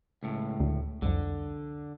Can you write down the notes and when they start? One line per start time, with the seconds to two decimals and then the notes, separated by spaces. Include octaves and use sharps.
0.23 C#2 A2
0.60 D2
1.02 C2 F2 D3